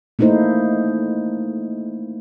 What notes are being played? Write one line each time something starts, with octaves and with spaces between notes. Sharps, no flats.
A3 A#3 D#4 E4 C5